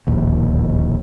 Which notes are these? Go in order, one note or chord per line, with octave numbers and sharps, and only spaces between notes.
D1 A#1 D#2